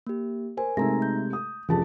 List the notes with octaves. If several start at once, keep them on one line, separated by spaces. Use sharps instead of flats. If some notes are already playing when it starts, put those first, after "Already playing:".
A#3 G4
A#4 C5 G#5
C3 G#3 A3 D#4 A#5 A#6
G6
D#6
F1 C#4 F4 G#4 A5